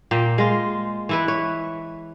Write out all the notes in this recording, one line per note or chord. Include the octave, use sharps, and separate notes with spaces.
A#2 A#3 G5
G#3 F4
E3 E4 B4
C#5